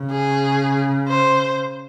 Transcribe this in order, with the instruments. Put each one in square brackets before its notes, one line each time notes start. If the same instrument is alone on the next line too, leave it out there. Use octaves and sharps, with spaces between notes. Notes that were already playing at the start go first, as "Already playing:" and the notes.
Already playing: [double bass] C#3
[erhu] G#4
C5